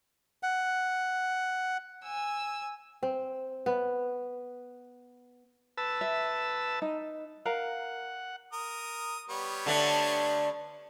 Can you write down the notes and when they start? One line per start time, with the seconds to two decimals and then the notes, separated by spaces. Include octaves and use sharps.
0.43 F#5
2.04 G#5 E6
3.03 C4
3.66 B3
5.78 B4 A5 E6
6.01 E5
6.82 D#4
7.45 A#4 F5 F#5 A#5
8.53 A#4 D#6
9.30 G3 B3 C#5
9.66 D3 A3 D4